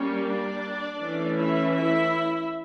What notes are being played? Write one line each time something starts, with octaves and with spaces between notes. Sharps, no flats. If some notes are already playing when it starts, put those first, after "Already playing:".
Already playing: G3 A#3 C#4
D4 D5
E3 A3 C#4
E4 E5
E4 E5